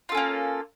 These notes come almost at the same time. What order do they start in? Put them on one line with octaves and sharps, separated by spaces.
F4 A4 C#4 A#3